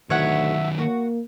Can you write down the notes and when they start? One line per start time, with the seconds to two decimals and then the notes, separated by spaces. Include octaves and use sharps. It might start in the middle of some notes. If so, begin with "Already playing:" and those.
0.10 D2 D#3 F#3 C#5 E5 F#5
0.79 A#3 F#4